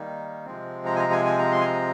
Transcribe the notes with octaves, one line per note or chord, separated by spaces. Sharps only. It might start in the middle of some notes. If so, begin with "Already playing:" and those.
Already playing: D#3 G3 A#3 D#4
C3 F3 G#3 C4
A#5
G#5
A#5
G#5
G#5
A#5
C6
G#5
A#5